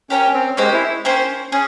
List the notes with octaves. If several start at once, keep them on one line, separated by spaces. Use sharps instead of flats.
C#4 G4 A#4 C#5 G5
C4
G#3 A#3 C#4 G4 C5
E4
A#3 C#4 G4 C5
C#4 G#4